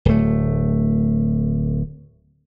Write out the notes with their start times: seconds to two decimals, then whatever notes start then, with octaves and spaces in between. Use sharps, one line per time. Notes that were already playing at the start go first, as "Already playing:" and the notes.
0.05 D1 A3